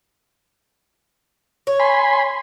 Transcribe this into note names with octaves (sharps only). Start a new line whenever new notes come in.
C#5
G#5 B5 C6